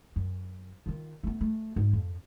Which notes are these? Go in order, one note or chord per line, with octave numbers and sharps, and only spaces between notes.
F#2
D#3 F4
A3 B3
A3
G#2
F2